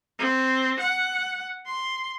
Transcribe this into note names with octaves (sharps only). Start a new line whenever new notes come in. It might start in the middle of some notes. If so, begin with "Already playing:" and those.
C4
F#5
C6